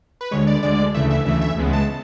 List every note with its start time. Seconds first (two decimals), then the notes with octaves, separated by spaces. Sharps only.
0.21 B4
0.31 D2 D3 G#3 C#5
0.47 D5
0.63 D2 D3 G#3 D5
0.94 D2 C#3 E3 A3 E5
1.10 E5
1.26 D2 C#3 E3 A3 E5
1.41 E5
1.57 C#2 C#3 G#3 B3
1.73 A5